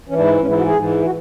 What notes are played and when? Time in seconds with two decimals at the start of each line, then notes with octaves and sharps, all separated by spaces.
0.09 E3 C#4
0.14 G#2 D4
0.25 E4
0.41 G#2 C#4
0.46 E3 E4
0.58 F#4
0.66 G#4
0.74 G#2 E3
1.06 F#4